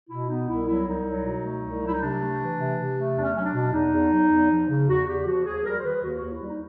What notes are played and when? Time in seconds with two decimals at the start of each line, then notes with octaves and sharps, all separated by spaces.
0.09 B2 E4
0.28 B3 D#4
0.47 C2 E4
0.66 F#3 E4
0.86 C2 D#4
1.05 F#3
1.24 B2
1.43 A3
1.62 C2
1.81 F#3 E4
1.93 D#4
2.01 C3 D4
2.20 A3
2.39 E3
2.58 C3
2.77 C3
2.97 A3
3.15 E2 D4
3.23 C#4
3.35 F#3 C#4
3.44 D4
3.54 B2
3.73 E2 D#4
3.92 E2
4.11 F#3
4.31 E2
4.50 F3
4.69 C#3
4.88 E2 F#4
5.07 E2 G4
5.26 F3 F#4
5.45 D#2 G#4
5.64 G3 A#4
5.79 C5
5.84 D#3 B4
6.03 D#2 F#4
6.17 D#2 F#4
6.31 E4
6.41 G3
6.46 D#4